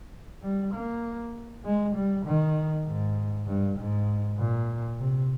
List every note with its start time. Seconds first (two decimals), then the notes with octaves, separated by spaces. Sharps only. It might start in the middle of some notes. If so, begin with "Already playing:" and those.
0.42 G3
0.73 A#3
1.64 G#3
1.95 G3
2.25 D#3
2.86 G#2
3.47 G2
3.78 G#2
4.38 A#2
4.99 C3